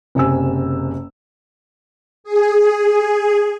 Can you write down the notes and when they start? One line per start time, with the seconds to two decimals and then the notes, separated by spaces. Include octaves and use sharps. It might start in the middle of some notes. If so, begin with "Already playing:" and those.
0.15 F#1 C3 G#5 E6
2.24 G#4